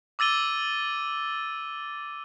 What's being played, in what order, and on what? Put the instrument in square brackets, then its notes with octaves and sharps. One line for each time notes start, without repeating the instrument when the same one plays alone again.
[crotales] D6 E6 A6 D#7 G7